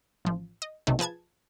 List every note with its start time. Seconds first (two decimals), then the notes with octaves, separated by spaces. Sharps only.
0.25 A1 F3
0.62 D#5
0.87 B1 C3 D#3 A3
0.99 F3 G#4 B4 A5 G#6